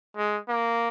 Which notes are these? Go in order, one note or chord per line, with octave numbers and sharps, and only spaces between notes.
G#3
A#3